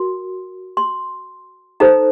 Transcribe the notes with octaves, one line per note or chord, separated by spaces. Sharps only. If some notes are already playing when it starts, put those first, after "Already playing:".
Already playing: F#4 A#4 C6
C6
D#4 A4 C5 A#5